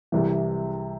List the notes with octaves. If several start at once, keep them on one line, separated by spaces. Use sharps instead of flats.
C2 C3 E3